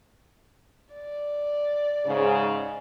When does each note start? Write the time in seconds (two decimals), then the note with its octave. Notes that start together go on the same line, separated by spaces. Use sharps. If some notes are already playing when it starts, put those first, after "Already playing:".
0.93 D5
2.06 G#2 C#3